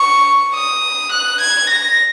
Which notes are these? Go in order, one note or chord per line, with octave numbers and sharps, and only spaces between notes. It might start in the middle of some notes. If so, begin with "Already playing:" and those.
Already playing: C#6
D#6
F#6
G#6
A#6